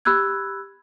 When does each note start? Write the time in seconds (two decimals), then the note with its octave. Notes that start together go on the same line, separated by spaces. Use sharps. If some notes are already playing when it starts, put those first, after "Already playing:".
0.05 G4 B5 E6 F#6 G#6